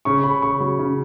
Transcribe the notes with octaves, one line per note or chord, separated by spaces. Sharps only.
C#3 C#6
C#3 B5
C#3 C#6
F#3
C#3